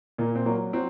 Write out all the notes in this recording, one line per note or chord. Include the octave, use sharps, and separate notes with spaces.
A#2 A#3
C4
F#3 A#3
F#3 C4